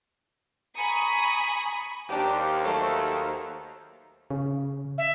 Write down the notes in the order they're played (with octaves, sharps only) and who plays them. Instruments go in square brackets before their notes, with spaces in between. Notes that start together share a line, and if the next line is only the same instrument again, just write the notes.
[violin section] G#5 A#5 B5 C#6 D#6
[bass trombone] D#2 [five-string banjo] A#3 D4 [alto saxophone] G4 [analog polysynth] C5 F5 A#5
[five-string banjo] F#3 A3 [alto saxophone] A4
[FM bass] C#3
[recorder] E5